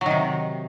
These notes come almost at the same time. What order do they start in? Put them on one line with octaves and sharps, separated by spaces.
F#3 D#3 C3